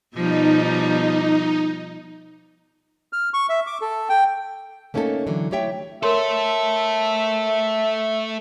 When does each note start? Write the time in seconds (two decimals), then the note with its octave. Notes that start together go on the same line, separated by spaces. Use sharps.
0.17 B2 F3 G3 D#4
3.13 F6
3.34 C#6
3.49 E5
3.67 D6
3.81 A4
4.09 G5
4.94 A3 A#3 C#4 D#4 G4 A4
5.27 D3 E3 F#3
5.51 A3 E4 G4 C#5 E5 G5
6.03 A3 A4 A#4 C#5 E5 C6